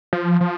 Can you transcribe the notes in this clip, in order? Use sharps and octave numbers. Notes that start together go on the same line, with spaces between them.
F3
F3